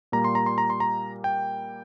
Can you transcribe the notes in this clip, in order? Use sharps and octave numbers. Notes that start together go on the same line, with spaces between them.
A#2 G3 A#3 A#5
C6
A#5
C6
A#5
C6
A#5
G5